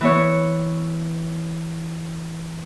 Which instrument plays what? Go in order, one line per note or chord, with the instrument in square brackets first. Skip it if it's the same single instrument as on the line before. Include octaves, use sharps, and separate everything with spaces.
[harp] E3 B3 C#5